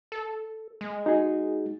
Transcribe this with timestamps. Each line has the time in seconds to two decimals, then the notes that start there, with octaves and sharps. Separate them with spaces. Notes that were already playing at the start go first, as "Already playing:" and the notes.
0.12 A4
0.81 G#3
1.06 D#4 F#4 G#4